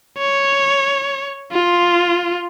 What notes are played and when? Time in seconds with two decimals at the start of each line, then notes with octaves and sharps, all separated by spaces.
0.18 C#5
1.52 F4